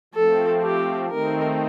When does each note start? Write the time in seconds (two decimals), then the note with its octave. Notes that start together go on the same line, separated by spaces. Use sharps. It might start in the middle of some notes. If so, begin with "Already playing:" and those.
0.14 F3 A3 C4 A4
0.63 G4
1.10 D#3 A3 C4 D#4 A#4